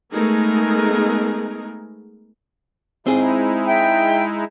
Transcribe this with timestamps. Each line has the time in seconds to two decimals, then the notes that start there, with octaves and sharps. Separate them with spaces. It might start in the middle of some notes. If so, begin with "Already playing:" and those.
0.12 G#3 A3 B3 D#4 G#4 A#4
3.07 G#3 C4 D#4 E4 G#4
3.67 E5 G5